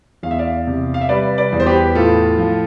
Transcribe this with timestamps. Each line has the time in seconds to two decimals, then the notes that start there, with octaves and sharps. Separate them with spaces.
0.23 E2 F5
0.31 E5
0.39 D5 F5
0.67 C3
0.94 F5
1.01 E5
1.09 G3 B4 D5
1.38 B4 D5
1.52 E2
1.60 C5
1.66 G4 B4
1.95 A2 F4 A4
2.38 F3